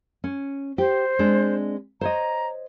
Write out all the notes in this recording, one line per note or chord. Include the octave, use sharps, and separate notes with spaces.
C#4
G4 C5
G#3 C4 D4
C5 C#5 D#5 A#5